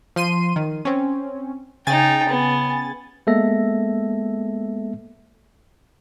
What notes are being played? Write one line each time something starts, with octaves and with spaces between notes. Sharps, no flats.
F3 C6 D#7
D#3
C4 C#4
C#3 D#4 G5 G#5 A6
B3
G#3 A#3 B3 A4 E5 A#6